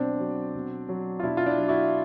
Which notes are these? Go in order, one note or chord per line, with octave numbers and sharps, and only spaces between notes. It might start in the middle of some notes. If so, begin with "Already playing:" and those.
Already playing: B2 F#3 C4 D4
F#3
B2
F#3
F4
B2 D4 E4
F4
D4 E4
F#3
E4 F#4